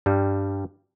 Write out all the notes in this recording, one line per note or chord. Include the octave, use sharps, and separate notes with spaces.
G2 G3